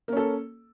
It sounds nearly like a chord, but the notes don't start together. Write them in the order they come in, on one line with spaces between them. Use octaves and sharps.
A#3 C#4 A4